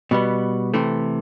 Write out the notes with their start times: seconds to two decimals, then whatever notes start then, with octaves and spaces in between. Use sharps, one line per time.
0.11 B2 G3 B3
0.74 C3 E3 A3